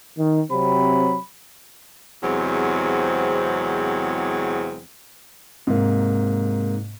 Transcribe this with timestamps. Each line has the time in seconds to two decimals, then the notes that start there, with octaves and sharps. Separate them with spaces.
0.18 D#3
0.51 C3 F#3 C4 B5
2.23 E2 C3 F#3 G#3 C4
5.67 G#2 C3 A#3